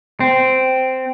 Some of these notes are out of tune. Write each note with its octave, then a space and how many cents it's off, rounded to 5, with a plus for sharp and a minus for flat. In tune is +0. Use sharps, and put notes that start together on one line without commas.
C4 -10